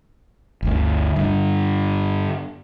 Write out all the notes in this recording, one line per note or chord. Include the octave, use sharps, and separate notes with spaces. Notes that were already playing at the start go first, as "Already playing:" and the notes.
G1 D2
G2 D3